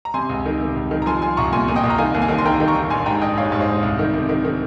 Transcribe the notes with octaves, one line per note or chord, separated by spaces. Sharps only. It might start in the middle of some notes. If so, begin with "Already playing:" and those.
A#5
C3 G#5 C6
C#2
D#3
C3
C#2
D#3
A#5
F3 G#5 C6
F3 G#5 C6
C2 A#5 C#6
A#2 G#5 C6
A#2
D#5 G5
C2
A#5
D#3 F5 G#5
D#2
F5 G#5
D#3
C6
D#3 G5 A#5
D#3
A#5 C#6
D#3
A#1 G#5 C6
G#2 G5 A#5
A#1 D#5 G5
G#2 C#5 F5
G#2 C#5
C5 D#5
A#1
C2
D#3
C3
D#3
D#3